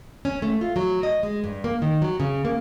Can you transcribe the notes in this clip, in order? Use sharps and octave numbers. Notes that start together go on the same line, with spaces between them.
C#4
A3
F4
F#3
D#5
G#3
G2
A#3
D#3
F#3
C#3
A#3